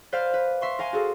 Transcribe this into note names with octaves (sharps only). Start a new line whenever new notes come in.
B4 C5 D5 F5 F6
B4
E5 C6 C#6
A#4 F5 G#5 C6
F#4 G#4 A4